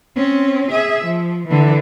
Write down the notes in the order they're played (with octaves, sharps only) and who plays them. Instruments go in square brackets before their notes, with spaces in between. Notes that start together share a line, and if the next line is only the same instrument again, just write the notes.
[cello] C4 C#4
G#4 E5
F3
D3 E3